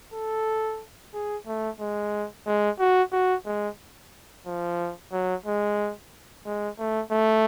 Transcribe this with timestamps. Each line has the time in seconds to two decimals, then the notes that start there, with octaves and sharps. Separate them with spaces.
0.14 A4
1.14 G#4
1.47 A3
1.80 G#3
2.47 G#3
2.79 F#4
3.12 F#4
3.45 G#3
4.46 F3
5.12 F#3
5.46 G#3
6.46 G#3
6.78 A3
7.12 A3